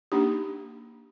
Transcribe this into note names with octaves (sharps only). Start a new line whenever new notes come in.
A#3 D4 D#4 G4